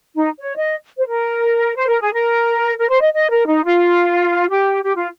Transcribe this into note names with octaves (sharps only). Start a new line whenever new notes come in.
D#4
C#5
D#5
C5
A#4
C5
A#4
G#4
A#4
A#4
C5
D#5
D#5
A#4
D#4
F4
G4
G4
F4